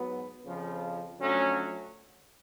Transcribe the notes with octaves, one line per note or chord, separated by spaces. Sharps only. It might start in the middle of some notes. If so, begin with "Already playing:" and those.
Already playing: G#2 F#3 B3
F2 C#3 F3
F2 D3 F#3 A3 C#4